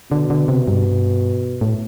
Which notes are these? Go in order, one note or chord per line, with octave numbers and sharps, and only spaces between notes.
B2 D3
D3
C3
G2
A2